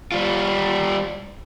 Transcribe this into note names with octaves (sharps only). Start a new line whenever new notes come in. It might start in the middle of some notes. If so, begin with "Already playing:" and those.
G3 F4